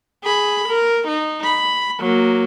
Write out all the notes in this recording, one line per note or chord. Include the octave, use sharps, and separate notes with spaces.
G#4 B5
A#4
D#4
B5
F#3 A#3